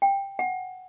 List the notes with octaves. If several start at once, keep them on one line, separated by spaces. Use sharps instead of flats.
G5
F#5